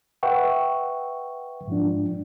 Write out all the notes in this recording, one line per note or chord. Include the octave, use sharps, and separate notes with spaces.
B4 E5 F#5 G5 C#6
G#2 F3 D4